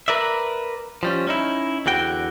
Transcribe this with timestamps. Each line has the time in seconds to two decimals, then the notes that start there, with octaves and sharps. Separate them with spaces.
0.08 A#4 B4 D5 E5
1.03 F3 G3 C#4
1.27 C#4 D#4 E4
1.86 E2 D3 F#4 G5